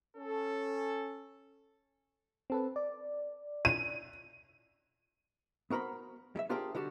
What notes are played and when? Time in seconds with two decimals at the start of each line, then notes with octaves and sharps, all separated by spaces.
0.17 C#4 A4
2.50 C4 A4 B4
2.76 D5
3.65 D#7
5.70 B3 F#4 A#4 C5 B5
6.36 G3 E5
6.49 D4 F4 G4 G#4 A#4 C5
6.75 D3 G3 F#4 G4 A5